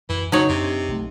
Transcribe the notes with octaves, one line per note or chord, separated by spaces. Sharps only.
F#2 E3
C#3 F#3 D#4 C#5
F#2 C3 D4
B1 A3